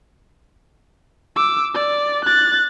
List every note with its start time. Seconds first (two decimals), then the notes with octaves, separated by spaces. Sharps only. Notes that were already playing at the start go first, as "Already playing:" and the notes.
1.36 D6 E6
1.74 D5
2.25 F#6 A6